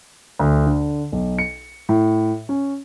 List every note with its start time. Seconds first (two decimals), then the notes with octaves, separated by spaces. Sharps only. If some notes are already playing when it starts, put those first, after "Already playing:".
0.39 D2
0.67 D3
1.12 B1
1.38 C#7
1.89 A2
2.49 C#4